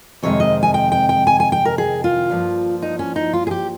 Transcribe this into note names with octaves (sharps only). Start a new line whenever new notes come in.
F2 C3 D#3 G#3 C#5
D#5
G#5
G5
G5
G5
G#5
G#5
G5
A#4
G#4
F4
G2 F3 A#3
D#4
C#4
D#4
F4
G#4
G4